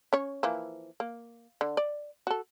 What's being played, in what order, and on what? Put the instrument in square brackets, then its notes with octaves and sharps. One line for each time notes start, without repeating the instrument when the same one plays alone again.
[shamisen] C#4 C#5
E3 F3 A#3
A#3
D3
D5
F#4 A4